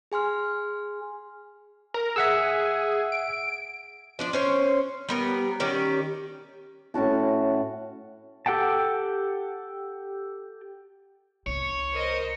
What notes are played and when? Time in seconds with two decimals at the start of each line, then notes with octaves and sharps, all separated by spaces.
0.12 G#4 G#5 C6 F6
1.94 A#4
2.16 G#4 E5 F#5 E6
3.12 D7
4.19 F3 D4 D5
4.33 C#4 C5 C#5
5.09 G3 B3 A#4
5.60 D#3 C#4 G4 D5
6.94 A2 C#4 F#4 A5
8.46 G4 A4 F#5 G5 A5
11.47 C2 D#4 C#5
11.94 A#4 C5 D#5